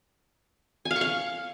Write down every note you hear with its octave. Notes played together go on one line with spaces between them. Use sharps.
G#5
F5
C#6
F5